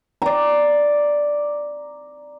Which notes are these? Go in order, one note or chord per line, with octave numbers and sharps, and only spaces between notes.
D5 A#5